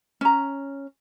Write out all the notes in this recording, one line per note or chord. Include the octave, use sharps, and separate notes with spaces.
C#4 A#5